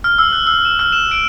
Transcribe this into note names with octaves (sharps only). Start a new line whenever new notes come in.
F6
E6
F#6
E6
E7
F6
E7
D7